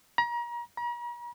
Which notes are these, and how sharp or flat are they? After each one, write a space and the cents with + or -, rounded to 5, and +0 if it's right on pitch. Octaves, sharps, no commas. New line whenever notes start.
A#5 +35
A#5 +45